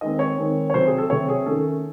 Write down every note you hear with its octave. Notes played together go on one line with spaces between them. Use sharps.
D#3 G#3 C4 D#5
C#5
D#3 G#3 C4
C#5
C3 F#3 A3 C4 C5
G#4
A4
C3 F#3 A3 C4 C#5
G#4
D#3 A3 C#4 A4